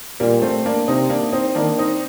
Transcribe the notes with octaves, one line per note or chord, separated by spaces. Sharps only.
A#2 G3 A#3
A3 C4
A#3 D4
C3 C4 D#4
A#3 D4
C4 D#4
D#3 A#3 D4
C4 D#4